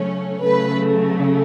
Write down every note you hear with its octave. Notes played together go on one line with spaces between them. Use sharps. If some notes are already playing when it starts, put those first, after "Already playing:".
Already playing: C#3 F#3 A3 C#4
C#3 F#3 A3 B4